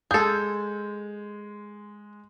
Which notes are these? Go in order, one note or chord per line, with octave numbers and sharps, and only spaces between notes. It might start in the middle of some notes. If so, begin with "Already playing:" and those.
G#3 G#4 A4 G6